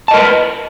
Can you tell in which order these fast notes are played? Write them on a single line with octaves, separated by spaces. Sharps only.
A5 D#5 A#4 B4